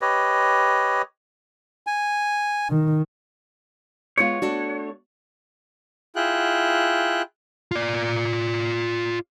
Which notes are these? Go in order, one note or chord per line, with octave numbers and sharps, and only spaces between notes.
G4 B4 C#5 D#5
G#5
D#3
G#3 B3 F4 C#5
A3 D4 F#4
E4 F4 G#4 G5 F#6
F4 D5